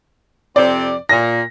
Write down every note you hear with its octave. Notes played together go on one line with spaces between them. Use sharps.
F2 C3 C4 D5
A#2 A#6